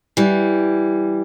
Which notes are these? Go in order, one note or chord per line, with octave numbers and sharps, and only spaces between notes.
E3 G3